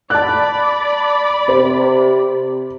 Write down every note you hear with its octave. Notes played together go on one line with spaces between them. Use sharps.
D5 A5 B5 F#6
C3 C5